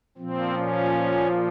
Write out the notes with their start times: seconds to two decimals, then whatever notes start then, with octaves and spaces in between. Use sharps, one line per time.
0.18 A#2 F3 C4
0.53 C#4